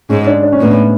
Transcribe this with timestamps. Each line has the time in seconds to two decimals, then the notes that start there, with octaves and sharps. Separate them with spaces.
0.09 G#2 C#4
0.27 D4
0.43 D4
0.52 C#4
0.60 A2 B3
0.71 C#4